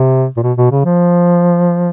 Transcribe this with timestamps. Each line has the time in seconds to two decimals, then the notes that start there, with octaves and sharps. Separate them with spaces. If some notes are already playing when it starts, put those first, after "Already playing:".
Already playing: C3
0.37 A#2
0.43 B2
0.57 B2
0.71 C#3
0.85 F3